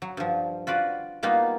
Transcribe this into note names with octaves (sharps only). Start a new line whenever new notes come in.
F#3
G2 F3
F4 F#4 B4 D5
G3 A#3 B3 D#4 F4